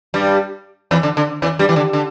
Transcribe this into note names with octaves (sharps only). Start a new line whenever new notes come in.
G2 G3
E2 E3
D3
D3
E2 E3
G2 G3
E3
D3
D3